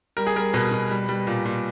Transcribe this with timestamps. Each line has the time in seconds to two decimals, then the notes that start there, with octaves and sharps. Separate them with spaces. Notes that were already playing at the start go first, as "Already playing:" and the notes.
0.17 G3 A#4
0.27 G#4
0.36 G3 A#4
0.54 B2 B4
0.72 B2
0.91 G3
1.09 G3
1.27 A#2
1.45 A#2